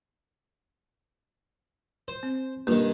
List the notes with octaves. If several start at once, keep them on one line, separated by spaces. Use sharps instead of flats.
C5
C4
G2 D#3 A#3 F4